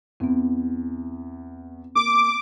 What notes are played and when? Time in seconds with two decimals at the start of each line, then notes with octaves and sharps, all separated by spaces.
0.20 E2 B3 C4
1.95 A#3 D6